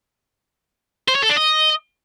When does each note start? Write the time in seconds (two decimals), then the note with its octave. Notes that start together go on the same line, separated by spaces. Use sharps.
1.08 C5
1.15 C#5
1.22 A4
1.29 D4
1.36 D#5